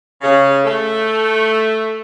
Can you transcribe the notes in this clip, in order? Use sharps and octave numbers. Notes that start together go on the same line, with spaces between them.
C#3
A3